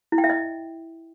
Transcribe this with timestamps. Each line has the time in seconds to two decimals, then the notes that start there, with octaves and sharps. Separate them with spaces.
0.12 E4
0.18 G5
0.24 E5
0.30 D#5